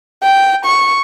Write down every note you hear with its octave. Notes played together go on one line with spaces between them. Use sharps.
G5
C#6